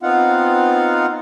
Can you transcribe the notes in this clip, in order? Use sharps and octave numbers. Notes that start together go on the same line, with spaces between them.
B3 C4 D#4 F4 F5 F#5